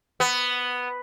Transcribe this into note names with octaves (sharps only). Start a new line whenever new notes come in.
B3